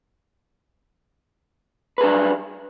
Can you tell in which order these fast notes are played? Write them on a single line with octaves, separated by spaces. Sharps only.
B4 G#4 D4 F#3 G3